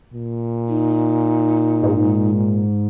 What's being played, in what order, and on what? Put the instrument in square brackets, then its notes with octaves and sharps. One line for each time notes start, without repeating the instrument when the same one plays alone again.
[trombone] A#2
[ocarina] D#4
[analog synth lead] G#2